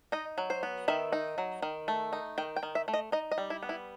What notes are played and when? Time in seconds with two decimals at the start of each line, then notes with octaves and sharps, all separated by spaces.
0.12 D#4 D#5
0.38 F#3
0.50 C5
0.63 B3
0.88 D#3 E5
1.13 D#4
1.38 F#3
1.62 D#3
1.88 A3
2.13 D#4
2.38 D#3 G5
2.56 G5
2.63 D#3
2.75 E5
2.88 A3
2.94 D#5
3.12 D#4 D#5
3.31 D#5
3.38 G3
3.50 E4
3.63 B3
3.69 E4